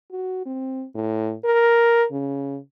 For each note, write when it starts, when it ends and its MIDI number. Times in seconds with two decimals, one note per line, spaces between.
0.12 0.44 66
0.46 0.84 60
0.95 1.34 45
1.45 2.05 70
2.12 2.57 49